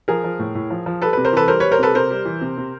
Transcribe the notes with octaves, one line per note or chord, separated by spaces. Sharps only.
F3 G#4 A#4
F3
A2
A2
F3
F3
G3 A4 B4
C3 B4
A#4 C5
E3 A4 B4
G3 A#4 C5
G3 B4 C#5
A#4 C5
C3 A4 B4
C3 A#4 C5
G3
E3
C3
C3